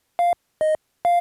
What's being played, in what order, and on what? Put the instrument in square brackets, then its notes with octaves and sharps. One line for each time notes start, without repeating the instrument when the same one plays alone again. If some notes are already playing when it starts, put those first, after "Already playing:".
[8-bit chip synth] F5
D#5
F5